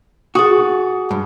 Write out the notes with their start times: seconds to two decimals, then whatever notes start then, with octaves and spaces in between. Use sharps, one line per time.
0.35 F#4 G#4 D#6
1.11 G2